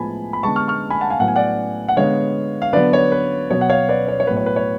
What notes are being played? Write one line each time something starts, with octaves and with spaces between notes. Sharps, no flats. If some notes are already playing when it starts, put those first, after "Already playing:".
Already playing: A2 F3 G#3 B3 G#5 A5 B5
B5
D3 G#3 B3 A5 C#6
C#6 F6
C#6 F6
G#5 B5
F#5 A5
F5 G#5
A2 F#3 B3 F#5
G#5
D5 F#5
F#5
D3 G#3 B3 C#5 F5
F5
D3 F#3 B3 B4 D5
C#5
B4
B2 F#3 B3 C#5
F#5
C#5 F5
B4 D5
C#5
C#5
A2 F#3 B3 B4
C#5
B4
C#5